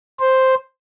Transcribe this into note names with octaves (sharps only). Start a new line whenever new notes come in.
C5